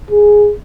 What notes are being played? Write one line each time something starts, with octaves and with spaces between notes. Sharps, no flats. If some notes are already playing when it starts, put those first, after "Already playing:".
G#4